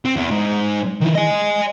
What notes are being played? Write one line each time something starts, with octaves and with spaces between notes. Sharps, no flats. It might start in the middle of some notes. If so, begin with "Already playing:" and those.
C4
E2
G#2
D#3 E3
D#5 G#5